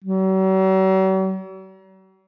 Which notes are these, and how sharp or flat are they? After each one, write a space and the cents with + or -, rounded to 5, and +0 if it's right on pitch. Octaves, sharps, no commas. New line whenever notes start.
F#3 +45